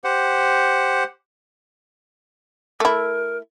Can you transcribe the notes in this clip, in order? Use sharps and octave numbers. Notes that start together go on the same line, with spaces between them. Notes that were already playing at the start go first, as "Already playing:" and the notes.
G4 C5 F#5
A3 E4 A#4